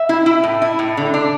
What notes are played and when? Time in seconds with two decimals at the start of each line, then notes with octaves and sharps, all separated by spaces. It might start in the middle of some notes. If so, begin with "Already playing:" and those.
Already playing: E5
0.09 E4
0.26 E4
0.44 A2
0.62 E4
0.79 A2
0.97 D3
1.14 D4